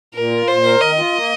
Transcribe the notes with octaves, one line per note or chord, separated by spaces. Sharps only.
A#2 A#4
F4
A#2 C5
A#4
D#3 D#5
F4
A#3